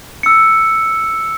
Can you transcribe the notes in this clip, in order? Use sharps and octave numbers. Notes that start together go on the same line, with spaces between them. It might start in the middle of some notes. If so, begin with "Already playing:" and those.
E6 C#7